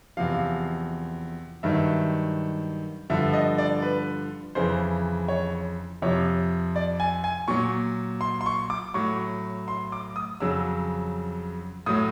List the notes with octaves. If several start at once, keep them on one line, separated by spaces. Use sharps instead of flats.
E2 C3 F3 F5
G2 D#3 F#3 E5
G2 D3 F3 E5
D#5
D5
B4
F2 C#3 E3 C5
C#5
F2 C3 F3 C#5
D5
G#5
G#5
A#2 F#3 C#6
C6
C6
C#6
D6
A2 F#3 C#6
C6
D6
D#6
F2 C#3 F#3 E6
A2 F#3 D#6